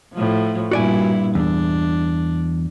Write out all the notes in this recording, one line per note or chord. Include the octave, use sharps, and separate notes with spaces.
A2 F3
G2 A#2 E4 F#4 D5 G#5
E2 D4